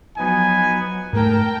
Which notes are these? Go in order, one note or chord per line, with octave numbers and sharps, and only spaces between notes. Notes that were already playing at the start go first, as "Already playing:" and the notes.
F3 F#3 B3 D#4 G#5
G#2 A3 A#4 G5 A5